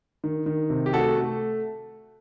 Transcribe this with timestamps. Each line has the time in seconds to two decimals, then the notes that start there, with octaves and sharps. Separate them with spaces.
0.24 D#3
0.46 D#3
0.70 C3
0.86 G4
0.93 A3 F#4 A4
1.16 A3